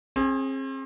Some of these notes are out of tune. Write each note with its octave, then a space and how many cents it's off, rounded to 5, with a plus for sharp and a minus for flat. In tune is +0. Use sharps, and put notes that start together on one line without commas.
C4 +40 G#4 +0